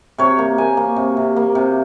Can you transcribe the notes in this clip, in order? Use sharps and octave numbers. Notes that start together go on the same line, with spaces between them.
C3 C#5
A#3
A#3 G#5
A#3
C3
C3
A#3
C3